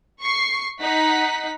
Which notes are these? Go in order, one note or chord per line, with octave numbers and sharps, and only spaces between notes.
C#6 C7
D#4 F#5 B6